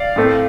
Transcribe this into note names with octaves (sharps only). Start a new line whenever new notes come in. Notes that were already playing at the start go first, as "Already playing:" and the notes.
Already playing: D5 F5
A2 A3 C4